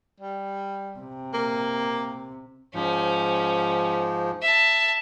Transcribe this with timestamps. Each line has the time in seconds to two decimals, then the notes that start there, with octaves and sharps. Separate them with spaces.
0.20 G3
0.99 C3
1.33 A#3
2.75 G#2 F3 C#4
4.42 E5 A5